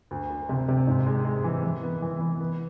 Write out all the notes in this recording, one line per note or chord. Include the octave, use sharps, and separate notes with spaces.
D2
D2
C3
C3
G#2
G#3
G#3
E3
E3
B3
E3
E3
B3